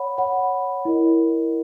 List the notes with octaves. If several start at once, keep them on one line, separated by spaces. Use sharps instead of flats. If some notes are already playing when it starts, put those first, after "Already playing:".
Already playing: C#5 F#5 B5
C#5 F#5 B5
E4 A#4 D#5